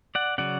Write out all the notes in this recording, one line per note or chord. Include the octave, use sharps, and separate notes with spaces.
D5 F#5
C#3 F#3 C#4 D5 F#5